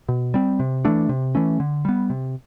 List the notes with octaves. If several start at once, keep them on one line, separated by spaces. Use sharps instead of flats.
B2
G3 C4
C3
E3 A3 D4
C3
E3 A3 C#4
D3
G3 B3
C3